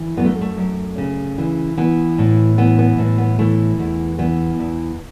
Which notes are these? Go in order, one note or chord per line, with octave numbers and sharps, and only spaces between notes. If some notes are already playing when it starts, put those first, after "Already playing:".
Already playing: E3
F#2 B3
A3
A3
F#2
C#3
E3
E3 B3
A2
E3 B3
B3
A2
B3
E3 A3
E2
E3 B3
E2